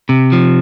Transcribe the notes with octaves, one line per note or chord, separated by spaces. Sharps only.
C3
F3